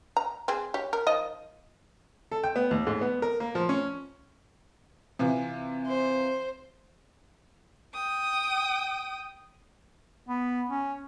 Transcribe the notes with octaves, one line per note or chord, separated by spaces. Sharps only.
A#5
C4 G#4
G4 C#5
A#4
D#3 F3 D#5
A4
G5
B3
D#2
G#2
B3
A#4
A#3
F3
C#4
C3 E3 F4
C5
G5 D#6
B3
C#4